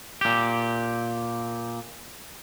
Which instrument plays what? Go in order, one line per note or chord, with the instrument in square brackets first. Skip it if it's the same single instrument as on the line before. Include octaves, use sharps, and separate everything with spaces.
[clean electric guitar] A#2 G4